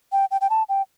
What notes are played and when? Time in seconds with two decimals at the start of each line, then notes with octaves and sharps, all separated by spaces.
0.12 G5
0.31 G5
0.41 G5
0.50 A5
0.69 G5